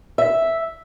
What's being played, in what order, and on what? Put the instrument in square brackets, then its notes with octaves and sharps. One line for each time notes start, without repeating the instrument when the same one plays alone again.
[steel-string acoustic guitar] E5